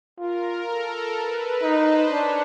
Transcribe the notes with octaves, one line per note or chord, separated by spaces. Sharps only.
F4 A#4
A4
B4
D#4 C5
D4 C#5